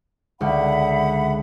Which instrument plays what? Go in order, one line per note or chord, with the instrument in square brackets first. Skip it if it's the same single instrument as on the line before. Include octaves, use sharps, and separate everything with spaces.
[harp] C#2 D3 [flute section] E5 F#5 B5